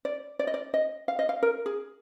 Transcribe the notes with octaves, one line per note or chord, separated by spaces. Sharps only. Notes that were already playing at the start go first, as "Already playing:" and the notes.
D5
D5
D#5
D5
D#5
F5
D#5
F5
A#4
G#4